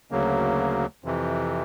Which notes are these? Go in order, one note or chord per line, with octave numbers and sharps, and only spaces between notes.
D2 C#3 F#3 A#3
F2 C3 E3